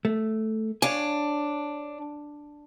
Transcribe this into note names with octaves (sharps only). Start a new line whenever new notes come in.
A3
D4 C#5 F5 G#5